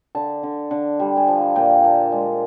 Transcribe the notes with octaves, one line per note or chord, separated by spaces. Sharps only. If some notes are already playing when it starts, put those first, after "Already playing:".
D3 A5
D3
D3
G3
G#5
F3 A5
G#5
A#2 G5
A#2 A5
G#3